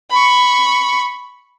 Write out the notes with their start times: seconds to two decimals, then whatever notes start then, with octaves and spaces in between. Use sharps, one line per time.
0.10 B5 C#6